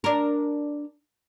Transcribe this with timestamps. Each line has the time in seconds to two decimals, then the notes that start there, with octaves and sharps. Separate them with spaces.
0.04 D4 A#4